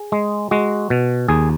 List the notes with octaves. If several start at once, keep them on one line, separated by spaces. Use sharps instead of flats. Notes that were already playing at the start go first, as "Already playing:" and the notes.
Already playing: G#4
G#3
G#3 F#4
B2
D#2 G#4